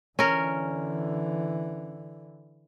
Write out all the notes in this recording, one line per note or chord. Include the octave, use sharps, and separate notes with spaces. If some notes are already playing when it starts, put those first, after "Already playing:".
D3 E3 C#4 A#4